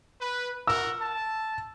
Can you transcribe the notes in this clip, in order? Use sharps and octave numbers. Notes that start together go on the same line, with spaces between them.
B4
F#4 A#4 E6
A5